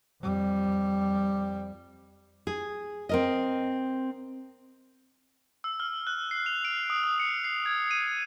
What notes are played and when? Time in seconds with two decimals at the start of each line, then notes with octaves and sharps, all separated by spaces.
0.22 F2 G3
2.47 G#4
3.09 C4 A#4 D#5
5.64 E6
5.80 F6
6.07 F#6
6.31 C7
6.46 F7
6.65 D7
6.90 D#6
7.04 D#6
7.20 C#7
7.44 C7
7.66 G#6
7.91 D#7